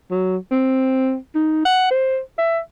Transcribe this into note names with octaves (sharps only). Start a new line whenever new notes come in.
F#3
C4
D#4
F#5
C5
E5